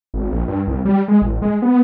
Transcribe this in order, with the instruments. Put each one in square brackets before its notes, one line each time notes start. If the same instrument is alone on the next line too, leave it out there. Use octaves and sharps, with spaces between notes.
[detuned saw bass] G#1
A#1
G2
C2
G3
G#3
A1
G#3
B3